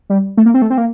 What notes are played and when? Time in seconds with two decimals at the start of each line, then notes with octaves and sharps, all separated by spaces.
0.10 G3
0.37 A3
0.46 A#3
0.54 C4
0.62 A3
0.70 C4
0.78 A#3